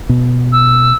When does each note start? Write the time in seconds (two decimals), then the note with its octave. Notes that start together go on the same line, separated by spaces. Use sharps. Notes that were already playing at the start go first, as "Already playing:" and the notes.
0.09 B2
0.52 E6